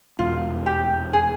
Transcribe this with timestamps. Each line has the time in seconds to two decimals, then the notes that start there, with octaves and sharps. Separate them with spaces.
0.19 F1 E2 B2 G#3 F4
0.66 G4
1.13 G#4